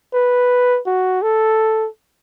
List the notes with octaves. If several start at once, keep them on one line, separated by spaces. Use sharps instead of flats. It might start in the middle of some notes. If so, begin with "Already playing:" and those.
B4
F#4
A4